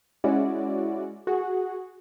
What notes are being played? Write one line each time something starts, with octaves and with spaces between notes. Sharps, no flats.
G#3 C#4 E4 F#4 D5
F#4 G#4